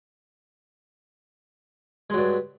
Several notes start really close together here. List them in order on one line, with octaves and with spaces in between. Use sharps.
G#3 F#3 G2